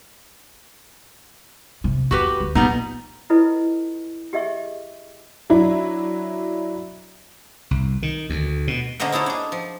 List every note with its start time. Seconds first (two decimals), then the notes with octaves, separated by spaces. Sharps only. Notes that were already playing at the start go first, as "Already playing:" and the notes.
1.84 C3
2.11 E2 F#4 G4 B4
2.40 D2
2.55 A#2 G3 B3 D#4
3.30 E4 F4 A4 B4 C5 D#5
4.33 G4 G#4 D#5 E5 C#6
5.50 F#3 D4 E4
7.71 C2
8.03 D#3
8.30 D2
8.68 B2
9.00 D3 A#3 G#4 C5 D#5 F#5
9.12 D#4 E4 G#4 A4 C#5
9.26 D4 G#4
9.52 F3